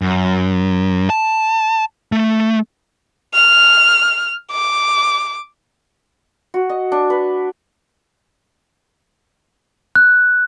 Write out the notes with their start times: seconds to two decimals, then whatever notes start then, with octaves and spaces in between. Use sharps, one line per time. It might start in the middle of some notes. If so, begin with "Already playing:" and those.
0.02 F#2
1.10 A5
2.12 A3
3.34 F6
4.52 D6
6.54 F#4
6.69 D#5
6.92 D4
7.10 B4
9.96 F#6